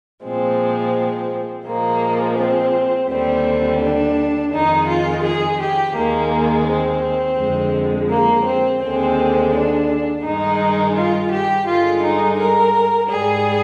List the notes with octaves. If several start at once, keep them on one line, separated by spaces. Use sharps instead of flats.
A#2 F3 G#3 C4
A#2 F3 G#3 A#3
C4
D#2 D3 G3 C4
D4
F2 D#3 G#3 D#4
F4
G#4
G4
D#2 D#3 G#3 A#3
C4
F2 D3 G#3
A#3
C4
D#2 D3 G#3 C4
D4
G2 D#3 G#3 D#4
F4
G4
G2 D3 G#3 F4
D#4
A#4
G#2 G3 G#4